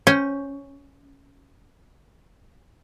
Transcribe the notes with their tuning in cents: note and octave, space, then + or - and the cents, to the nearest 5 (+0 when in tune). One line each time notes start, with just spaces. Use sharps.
C#4 +0 C5 +0 G5 -20